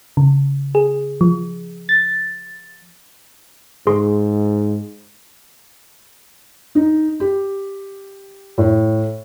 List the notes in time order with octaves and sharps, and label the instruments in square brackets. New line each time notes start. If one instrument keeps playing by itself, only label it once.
[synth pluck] C#3
G#4
F3
A6
[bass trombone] G#2 [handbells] G#4 C6 C#6
[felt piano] D#4
G4
A2